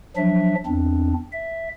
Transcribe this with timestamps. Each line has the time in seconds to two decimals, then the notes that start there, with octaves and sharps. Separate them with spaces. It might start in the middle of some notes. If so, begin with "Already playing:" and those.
0.17 F3 F#3 D4 E5
0.66 E2 C4 D4
1.32 E5